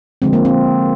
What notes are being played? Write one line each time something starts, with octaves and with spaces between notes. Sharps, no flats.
D3 F3 G#3 C4
A#3
C4